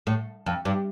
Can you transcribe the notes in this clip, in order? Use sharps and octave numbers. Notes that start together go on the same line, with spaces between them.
A2
F2
G2